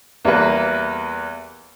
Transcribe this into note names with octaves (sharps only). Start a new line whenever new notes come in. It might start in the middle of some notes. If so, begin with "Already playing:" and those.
E2 G3 A#3 B4